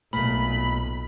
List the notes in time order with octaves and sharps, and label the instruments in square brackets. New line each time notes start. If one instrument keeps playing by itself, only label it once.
[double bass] B1 [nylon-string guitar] A#2 A3 [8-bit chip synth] B5